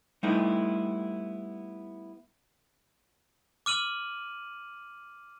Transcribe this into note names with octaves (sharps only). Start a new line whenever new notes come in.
G3 A3 B3 D#4 E4
D6 F6 D#7 F#7